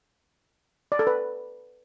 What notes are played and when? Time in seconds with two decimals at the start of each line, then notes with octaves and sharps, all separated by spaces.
0.92 D5
0.99 A4
1.07 B4